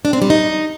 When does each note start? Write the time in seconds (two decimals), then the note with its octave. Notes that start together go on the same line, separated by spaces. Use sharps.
0.05 D4
0.13 C4
0.22 G3
0.30 D#4